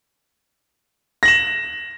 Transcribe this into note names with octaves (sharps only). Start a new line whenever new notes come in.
A#6 E7 F#7